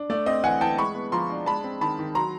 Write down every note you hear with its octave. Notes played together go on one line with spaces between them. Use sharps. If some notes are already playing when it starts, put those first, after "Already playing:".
Already playing: D4
A3 D5
C4 D#5
E3 F#5 G#5
E3 G5 A5
G#3 B5 C#6
B3
F3 A#5 C6
D4
G#3 A5 B5
C4
D#3 A5 B5
D#3
F#3 A#5 C6